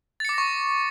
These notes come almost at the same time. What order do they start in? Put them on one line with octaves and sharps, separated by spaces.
A6 C#7 D6 A#6 C#6